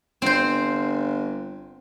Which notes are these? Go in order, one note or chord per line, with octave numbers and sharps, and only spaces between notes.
G1 C4 C5